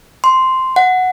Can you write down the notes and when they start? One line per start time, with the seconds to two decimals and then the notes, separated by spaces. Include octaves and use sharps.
0.24 C6
0.76 F#5